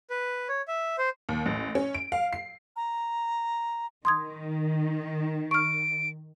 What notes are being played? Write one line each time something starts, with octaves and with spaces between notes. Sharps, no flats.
B4
C#5
E5
C5
D#2
A1
C#4
D7
F5
C7
A#5
D#3 C6 D#6 G#6
C#6 F6 D7